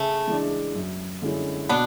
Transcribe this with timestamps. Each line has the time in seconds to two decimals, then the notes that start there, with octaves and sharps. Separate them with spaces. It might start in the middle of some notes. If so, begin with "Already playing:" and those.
Already playing: C#3 A3 C#4
0.27 E3 G#3 D4
0.75 F#2
1.22 D3 G#3 C#4 E4
1.69 B2 B3 D4